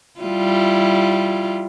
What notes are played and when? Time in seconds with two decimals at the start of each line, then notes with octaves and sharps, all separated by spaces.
0.20 G3 E4 F4